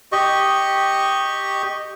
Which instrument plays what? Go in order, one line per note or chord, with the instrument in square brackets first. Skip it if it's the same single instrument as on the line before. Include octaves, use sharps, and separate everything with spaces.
[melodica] G4 D#5 C#6